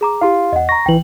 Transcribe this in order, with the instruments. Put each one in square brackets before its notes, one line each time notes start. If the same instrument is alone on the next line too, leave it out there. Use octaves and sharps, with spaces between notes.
[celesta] G#4 A#5 D6
[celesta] E4 G4 [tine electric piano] F5 C6
[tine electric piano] E2 [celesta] D#5 F#5
[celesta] A#5 C#6 [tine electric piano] A#6
[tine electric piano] B1 E3 [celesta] G5 F#7